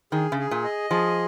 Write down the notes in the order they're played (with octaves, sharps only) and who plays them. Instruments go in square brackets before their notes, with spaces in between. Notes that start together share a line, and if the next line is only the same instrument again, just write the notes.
[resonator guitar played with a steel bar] D#3 [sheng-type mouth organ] G#4
[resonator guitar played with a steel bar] C#3
[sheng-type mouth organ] G#4
[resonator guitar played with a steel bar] A#2
[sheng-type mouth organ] D#5
[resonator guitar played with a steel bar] F3 [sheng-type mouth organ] G#4